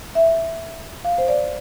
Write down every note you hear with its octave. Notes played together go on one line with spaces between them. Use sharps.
E5
F5
C5
D5